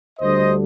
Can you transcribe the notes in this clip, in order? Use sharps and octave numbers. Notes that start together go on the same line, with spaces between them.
D2 D3 G3 C5 D#5